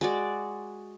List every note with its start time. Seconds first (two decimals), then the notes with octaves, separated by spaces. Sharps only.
0.01 G#3 F#4 D5